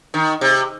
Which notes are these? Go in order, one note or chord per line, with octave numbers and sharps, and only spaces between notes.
D#3
C3